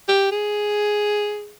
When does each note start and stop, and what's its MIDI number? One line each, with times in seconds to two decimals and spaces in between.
0.09 0.31 67
0.32 1.56 68